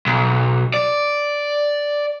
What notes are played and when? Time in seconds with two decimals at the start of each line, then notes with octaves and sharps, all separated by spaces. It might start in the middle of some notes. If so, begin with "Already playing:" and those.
0.07 B1
0.74 D5